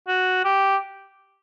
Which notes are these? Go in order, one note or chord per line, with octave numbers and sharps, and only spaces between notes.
F#4
G4